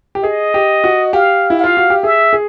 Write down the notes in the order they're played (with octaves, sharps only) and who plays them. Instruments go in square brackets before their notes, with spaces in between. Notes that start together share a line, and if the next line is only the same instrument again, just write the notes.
[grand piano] G4
[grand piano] G#4 [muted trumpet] D#5
[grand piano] G4
F#4
[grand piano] G4 [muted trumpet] F5
[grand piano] E4
[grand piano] F4 [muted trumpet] F5
[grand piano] F#4
G4
[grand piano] G#4 [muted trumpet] E5
[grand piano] G#4